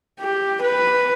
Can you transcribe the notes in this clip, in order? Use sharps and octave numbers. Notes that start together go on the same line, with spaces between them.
G4
B4